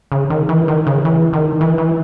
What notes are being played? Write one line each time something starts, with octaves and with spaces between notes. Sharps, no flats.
C#3
D#3
E3
D#3
C#3
E3
D#3
E3
E3